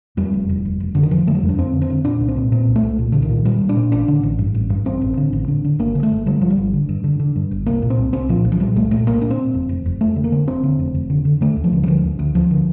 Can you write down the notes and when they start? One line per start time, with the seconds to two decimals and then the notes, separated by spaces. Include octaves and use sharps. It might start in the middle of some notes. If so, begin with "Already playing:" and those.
0.17 F2 G3
0.34 F1
0.49 F1
0.65 F1
0.80 F1
0.95 F1 D3
1.03 D#3
1.11 F1 F3
1.27 D3 A3
1.35 G3
1.43 F2
1.49 D4
1.58 F2 C4
1.73 D3
1.82 C4
1.90 D3
2.05 A#2 D4
2.20 C2
2.28 C4
2.36 A#2
2.52 A#2 C4
2.68 C2
2.76 A3
2.83 C2
2.98 A#2
3.12 C2 D3
3.22 D#3
3.30 A#2
3.45 A#2 G3
3.61 A#2
3.69 D4
3.77 A#2
3.92 A1 D4
4.08 D3
4.23 A1
4.39 G2
4.55 A1
4.70 G2
4.85 A1 C4
5.01 A1
5.17 D3
5.33 A1
5.48 D3
5.64 D3
5.79 G1 A#3
5.95 D3
6.03 A3
6.11 G1
6.26 D3 G3
6.41 G1 F3
6.50 G3
6.58 G1
6.73 D3
6.89 G2
7.04 D3
7.20 D3
7.36 G2
7.51 G1
7.66 C2 A#3
7.82 A#2
7.90 C4
7.98 C2
8.13 C2 C4
8.29 A#2 F3
8.45 C2
8.52 F3
8.60 A#2 G3
8.76 C2 A3
8.91 A#2 A3
9.07 C2 A#3
9.21 A#2 D4
9.30 C4
9.38 A#2
9.54 F1
9.69 F1
9.86 F1
10.01 F1 A3
10.16 D3
10.24 A#3
10.32 D3
10.48 F1 C4
10.63 D3
10.79 F1
10.94 F1
11.10 D3
11.25 D3
11.41 D3 A3
11.56 D2
11.64 F3
11.73 D3
11.83 G3
11.87 D3 F3
12.04 D2
12.19 D2
12.34 D2 F3
12.51 D3